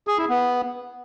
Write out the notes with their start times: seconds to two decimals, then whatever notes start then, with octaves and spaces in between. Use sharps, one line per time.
0.08 G#4
0.18 E4
0.29 B3